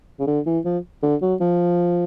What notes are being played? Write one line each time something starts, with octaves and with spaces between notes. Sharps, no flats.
C#3
D3
E3
F3
D3
F#3
F3